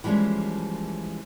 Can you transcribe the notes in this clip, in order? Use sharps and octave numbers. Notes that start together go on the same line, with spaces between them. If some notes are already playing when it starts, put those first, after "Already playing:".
E3 F3 G3 G#3 A#3 C#4